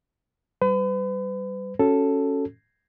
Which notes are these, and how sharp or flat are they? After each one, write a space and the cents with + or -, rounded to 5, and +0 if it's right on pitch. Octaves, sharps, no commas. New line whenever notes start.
G3 -20 B4 +40
C#4 +0 F#4 +5 A4 +0